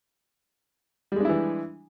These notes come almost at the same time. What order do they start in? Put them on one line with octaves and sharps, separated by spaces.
G3 G#3 D4 E4 E3